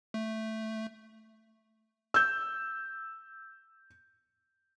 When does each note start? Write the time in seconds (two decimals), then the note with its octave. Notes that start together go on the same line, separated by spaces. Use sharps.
0.14 A3
2.14 E6 G6